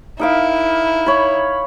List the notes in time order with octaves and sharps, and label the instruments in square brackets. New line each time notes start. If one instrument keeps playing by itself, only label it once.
[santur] D#4 A#4 F5 [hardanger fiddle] E4
[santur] C#5 B5